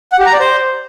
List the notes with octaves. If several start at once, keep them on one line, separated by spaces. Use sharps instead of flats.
F#5
G4
A#5
D5
C5